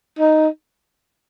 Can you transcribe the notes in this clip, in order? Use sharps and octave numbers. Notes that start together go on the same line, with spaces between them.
D#4